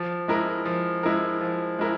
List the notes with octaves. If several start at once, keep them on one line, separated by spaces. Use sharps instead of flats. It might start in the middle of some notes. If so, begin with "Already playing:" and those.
Already playing: F3
G#3 E4 A#4
F3
G#3 E4 A#4
F3
G#3 E4 A#4